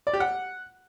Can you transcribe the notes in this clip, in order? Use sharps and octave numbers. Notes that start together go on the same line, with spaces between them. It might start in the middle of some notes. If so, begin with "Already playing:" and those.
D5
G4
F#5